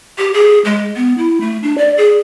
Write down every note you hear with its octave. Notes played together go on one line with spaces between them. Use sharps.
G4
G#4
G#3
B3
E4
A3
D4
D5
G#4